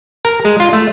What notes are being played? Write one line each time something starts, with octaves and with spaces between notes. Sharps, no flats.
A#4
G#3
F4
A3